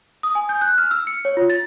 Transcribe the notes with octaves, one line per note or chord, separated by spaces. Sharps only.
D#6
G#5
G6
F#6
F6
E6
C#7
C#5
F4
A6